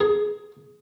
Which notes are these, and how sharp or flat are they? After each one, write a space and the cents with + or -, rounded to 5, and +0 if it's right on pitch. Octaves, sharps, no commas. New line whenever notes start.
G#4 +10